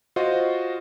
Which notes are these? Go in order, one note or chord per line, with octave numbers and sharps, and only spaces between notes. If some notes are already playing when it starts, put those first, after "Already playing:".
F4 F#4 C5 D#5